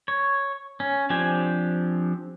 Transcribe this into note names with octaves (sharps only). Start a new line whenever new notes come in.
C#5
C#4
F3 C4 D4 G4 G#5